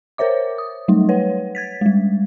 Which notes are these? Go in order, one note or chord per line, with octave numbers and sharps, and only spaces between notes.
A#4 C5 C#5 E5 D6
D#6
F#3 G3 A3 D#4
B4 C#5 F#5
G#6 A6 B6
G3 G#3